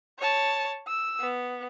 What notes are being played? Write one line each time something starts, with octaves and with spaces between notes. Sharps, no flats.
C#5 A5
E6
B3